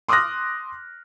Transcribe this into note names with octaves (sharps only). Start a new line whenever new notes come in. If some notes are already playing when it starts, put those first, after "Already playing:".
C6 D6 D#6 F6 F#6 A#6